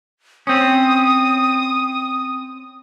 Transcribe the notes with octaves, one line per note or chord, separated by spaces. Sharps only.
C4 C#4 D#6